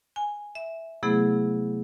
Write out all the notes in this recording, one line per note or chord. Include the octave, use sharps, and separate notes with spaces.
G#5
E5
C3 F#3 A3 B3 E4 G#4